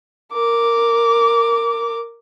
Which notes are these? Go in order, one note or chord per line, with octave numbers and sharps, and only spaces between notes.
A#4 D6